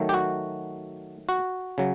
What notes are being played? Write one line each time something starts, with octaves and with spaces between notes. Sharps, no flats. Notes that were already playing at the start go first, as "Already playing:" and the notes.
Already playing: D#3 F#3 A3
G4
F#4
F#4
C#3 F#3